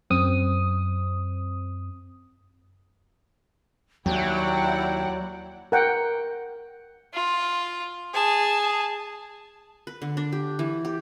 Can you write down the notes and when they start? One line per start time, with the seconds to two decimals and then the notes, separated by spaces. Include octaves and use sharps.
0.10 F#2 C4 D#6
4.06 D#2 F#3 E4 D5 F#5 G5
5.72 A#4 F#5 G5
7.14 F4
8.14 G#4 A5
9.87 B4
10.02 D3
10.17 D4
10.32 G4
10.59 E3
10.85 G4